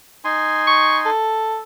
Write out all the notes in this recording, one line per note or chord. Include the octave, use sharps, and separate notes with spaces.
D#4 G#5 C6
C#6
A4